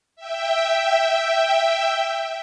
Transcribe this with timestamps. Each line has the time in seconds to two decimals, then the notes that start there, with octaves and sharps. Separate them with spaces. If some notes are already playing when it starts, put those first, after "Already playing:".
0.16 E5 G5